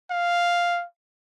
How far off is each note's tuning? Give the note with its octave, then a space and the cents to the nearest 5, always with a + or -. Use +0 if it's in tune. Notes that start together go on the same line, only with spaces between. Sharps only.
F5 +0